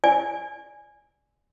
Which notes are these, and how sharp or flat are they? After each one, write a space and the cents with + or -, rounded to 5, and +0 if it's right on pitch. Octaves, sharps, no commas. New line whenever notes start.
D5 +0 G#5 +0